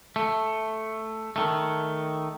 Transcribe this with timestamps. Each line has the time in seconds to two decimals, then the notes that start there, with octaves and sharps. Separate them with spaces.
0.16 A3
1.36 D#3 A3